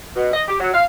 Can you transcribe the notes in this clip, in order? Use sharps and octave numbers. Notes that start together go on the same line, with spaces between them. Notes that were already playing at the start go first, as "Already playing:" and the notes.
B2
D#5
G4
F#3
F5